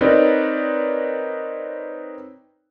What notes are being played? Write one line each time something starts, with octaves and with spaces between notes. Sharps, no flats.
C4 D#4 A#4 B4 C#5 D5